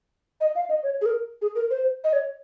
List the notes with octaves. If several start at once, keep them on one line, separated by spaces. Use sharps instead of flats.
D#5
F5
D#5
C#5
G#4
A#4
G#4
A#4
C5
D#5
C#5